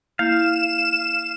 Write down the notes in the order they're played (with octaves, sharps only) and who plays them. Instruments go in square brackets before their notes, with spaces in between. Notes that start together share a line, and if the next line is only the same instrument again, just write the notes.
[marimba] A#3 E4 G6 [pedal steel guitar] F5 [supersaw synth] E7